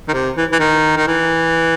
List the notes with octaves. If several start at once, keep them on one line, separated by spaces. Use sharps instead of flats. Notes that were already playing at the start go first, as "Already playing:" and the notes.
D#3
C3
E3
E3
D#3
D#3
E3